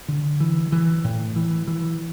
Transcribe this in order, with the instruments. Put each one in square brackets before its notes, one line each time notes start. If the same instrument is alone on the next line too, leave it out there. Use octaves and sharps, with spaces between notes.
[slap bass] D3
E3
E3
A2
E3
E3